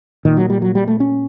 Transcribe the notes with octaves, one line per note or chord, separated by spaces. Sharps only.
A#2 D#3
F#3
G3
F#3
G3
A3
C#4